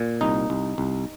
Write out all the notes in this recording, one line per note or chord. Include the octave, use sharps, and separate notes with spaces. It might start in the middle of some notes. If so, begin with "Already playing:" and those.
Already playing: A#2
C2 D#4
C2
C2